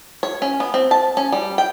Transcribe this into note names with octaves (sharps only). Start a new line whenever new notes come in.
C#5
C#4
B3
C4
A5
C#4
G3
G5